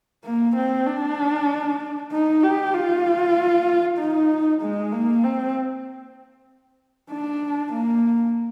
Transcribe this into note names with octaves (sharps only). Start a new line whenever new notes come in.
A#3
C4
D4
D#4
G4
F4
D#4
G#3
A#3
C4
D4
A#3